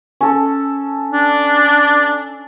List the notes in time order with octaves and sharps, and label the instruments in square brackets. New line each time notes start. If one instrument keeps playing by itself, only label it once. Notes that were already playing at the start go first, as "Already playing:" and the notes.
[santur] C#4 A4
[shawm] D4